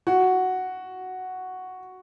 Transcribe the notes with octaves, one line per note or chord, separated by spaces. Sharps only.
F#4